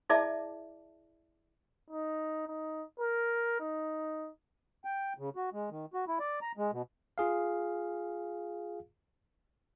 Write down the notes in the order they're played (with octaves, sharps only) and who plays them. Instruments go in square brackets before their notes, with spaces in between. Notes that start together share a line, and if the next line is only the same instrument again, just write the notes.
[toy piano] E4 G#4 D5 E5 A5 D6
[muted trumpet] D#4
D#4
A#4
D#4
[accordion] G5
C#3
F#4
G#3
D#3
F#4
E4
D5
A#5
G#3
B2
[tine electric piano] F4 G#4 F5